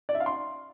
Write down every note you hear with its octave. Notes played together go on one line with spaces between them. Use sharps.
D5
E5
F5
C6